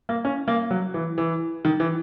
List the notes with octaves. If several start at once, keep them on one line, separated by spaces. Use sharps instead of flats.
A#3
C#4
A#3
F#3
E3
E3
D#3
E3